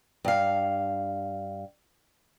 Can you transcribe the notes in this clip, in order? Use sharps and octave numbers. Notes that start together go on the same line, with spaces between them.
G2 F5